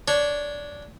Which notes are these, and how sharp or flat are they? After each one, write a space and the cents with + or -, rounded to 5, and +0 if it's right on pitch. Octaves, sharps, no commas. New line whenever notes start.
D4 -10 C#5 +0